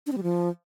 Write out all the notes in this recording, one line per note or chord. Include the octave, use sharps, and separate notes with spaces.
D4
C4
G3
F3